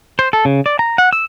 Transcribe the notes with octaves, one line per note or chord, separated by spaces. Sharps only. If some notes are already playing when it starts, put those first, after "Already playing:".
C5
A4
C#3
D5
A#5
F#5
E6